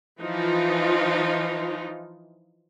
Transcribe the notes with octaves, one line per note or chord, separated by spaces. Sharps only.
E3 F3 D#4 F4